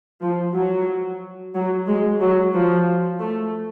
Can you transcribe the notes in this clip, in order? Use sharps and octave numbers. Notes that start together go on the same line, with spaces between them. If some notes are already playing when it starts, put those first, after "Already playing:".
F3
F#3
F#3
G#3
F#3
F3
A3